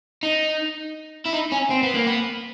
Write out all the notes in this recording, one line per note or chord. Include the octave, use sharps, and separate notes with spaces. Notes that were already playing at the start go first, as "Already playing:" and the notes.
D#4
E4
D#4
C#4
C4
B3
A#3
B3